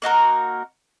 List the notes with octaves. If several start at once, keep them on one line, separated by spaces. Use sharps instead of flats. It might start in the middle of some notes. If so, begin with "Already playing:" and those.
A#3 D#4 F#4 A#4